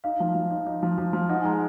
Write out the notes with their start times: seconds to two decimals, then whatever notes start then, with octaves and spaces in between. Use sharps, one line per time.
0.04 D#4 F5
0.20 F3
0.35 F3
0.50 D#4
0.67 D#4
0.83 F3
0.98 F3
1.13 F3
1.29 D#4 F#5
1.41 G#5
1.45 G#3 A#5
1.53 F#5